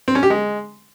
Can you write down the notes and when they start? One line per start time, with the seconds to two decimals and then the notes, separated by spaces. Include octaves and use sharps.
0.08 C4
0.15 C#4
0.23 G4
0.30 G#3